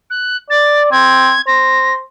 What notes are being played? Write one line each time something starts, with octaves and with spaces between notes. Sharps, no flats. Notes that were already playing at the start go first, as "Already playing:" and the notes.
F#6
D5 A6
C4 G#6
C5 A#6